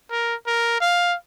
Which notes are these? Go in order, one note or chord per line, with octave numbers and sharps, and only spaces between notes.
A#4
A#4
F5